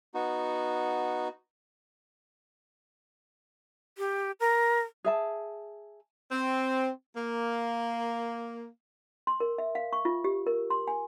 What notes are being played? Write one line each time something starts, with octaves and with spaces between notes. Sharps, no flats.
B3 D#4 F#4
G4
A#4
G#4 E5 A5
C4
A#3
C6
A#4
E5
F5
C#6
F4
G4
A#4
C6
G#5